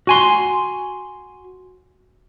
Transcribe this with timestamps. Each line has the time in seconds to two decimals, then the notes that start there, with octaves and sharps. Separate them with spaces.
0.07 F#4 G#5 C6